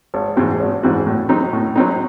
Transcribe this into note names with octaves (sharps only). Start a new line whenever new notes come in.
G#1
G#2 E3 C4 F#4
G#1
G#2 E3 C4 F#4
A2
F#3 C4 D#4
A2
F#3 C4 D#4